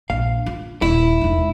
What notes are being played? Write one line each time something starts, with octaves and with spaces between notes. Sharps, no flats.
A#1 F5
F4
D#1 E4
E1 D#4